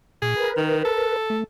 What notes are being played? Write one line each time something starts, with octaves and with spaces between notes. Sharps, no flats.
A#2 G#4
A#4 B4
D#3
A4
A3